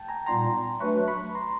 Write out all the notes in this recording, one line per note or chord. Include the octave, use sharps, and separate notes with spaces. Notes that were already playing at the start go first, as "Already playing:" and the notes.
Already playing: G5 A5
G#5 A#5
A#2 G3 B3 D#4 A#5 C6
F#3 A3 D4 F#4 B4 B5 C#6
B5 C#6
A#5 C6